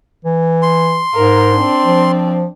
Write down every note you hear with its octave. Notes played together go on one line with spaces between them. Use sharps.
E3
C6
G#2 A#4
C4 D4
F3